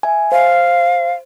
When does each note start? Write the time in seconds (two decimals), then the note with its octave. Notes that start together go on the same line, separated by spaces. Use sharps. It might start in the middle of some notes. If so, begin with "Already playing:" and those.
0.03 E5 G#5
0.32 C5 F5